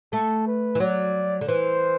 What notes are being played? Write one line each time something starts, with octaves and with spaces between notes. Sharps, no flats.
A3 A4
B4
E3
F#3 D5
D3
E3 C5